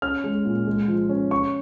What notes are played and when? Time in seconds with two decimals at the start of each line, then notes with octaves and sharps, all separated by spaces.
0.02 C#4 F6
0.24 G#3
0.45 A#2
0.67 G#3
0.88 F3
1.09 C#4
1.31 C#4 C#6